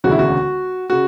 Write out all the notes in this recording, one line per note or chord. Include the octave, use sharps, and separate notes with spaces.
E1 D2 C#3 F#4
E4
F#4
C#3 F#4